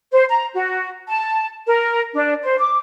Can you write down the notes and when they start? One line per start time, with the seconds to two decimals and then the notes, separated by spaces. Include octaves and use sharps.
0.12 C5
0.30 A#5
0.54 F#4
1.08 A5
1.67 A#4
2.14 D4
2.42 C5
2.59 D6